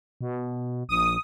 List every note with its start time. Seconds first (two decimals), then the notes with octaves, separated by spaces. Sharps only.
0.21 B2
0.89 A#1 D#6